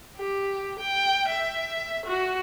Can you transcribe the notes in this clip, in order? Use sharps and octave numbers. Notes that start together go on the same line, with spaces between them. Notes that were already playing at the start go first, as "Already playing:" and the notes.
G4
G5
E5
F#4